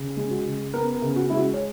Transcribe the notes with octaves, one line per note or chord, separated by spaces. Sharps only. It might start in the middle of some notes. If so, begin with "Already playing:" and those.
Already playing: C#3
G#3
F#4
C#3
B3 A#4
A#4
C#3
F#4
G#3 E4
F#4
C#5